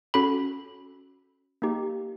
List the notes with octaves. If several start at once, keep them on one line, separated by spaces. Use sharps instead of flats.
C#4 F#4 A4 B5
A#3 D#4 G4